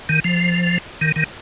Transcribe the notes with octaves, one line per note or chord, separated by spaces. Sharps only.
D#3
F3
D#3
D#3